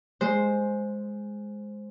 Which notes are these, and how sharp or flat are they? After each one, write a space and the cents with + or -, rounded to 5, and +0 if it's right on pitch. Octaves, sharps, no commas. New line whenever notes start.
G#3 +0 C5 +0